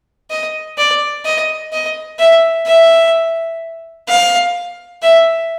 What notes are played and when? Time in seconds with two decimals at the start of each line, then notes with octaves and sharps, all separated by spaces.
0.30 D#5
0.78 D5
1.25 D#5
1.73 D#5
2.19 E5
2.67 E5
4.08 F5
5.02 E5